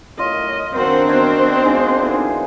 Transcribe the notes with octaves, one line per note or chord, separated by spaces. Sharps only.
A2 F4 A#4 C#5 D#5
D#3 F#3 C4 D4 A#4 C5 F#5
B3 F#4 C5 C#5 D#5
G#3 A#3 D#4 G#4
D3 E3